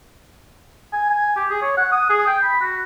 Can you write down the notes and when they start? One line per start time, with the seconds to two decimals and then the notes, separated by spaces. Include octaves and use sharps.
0.93 G#5
1.10 G#5
1.36 G4
1.50 G#4
1.62 C#5
1.77 F#5
1.92 D#6
2.10 G#4
2.27 G5
2.43 B5
2.61 F#4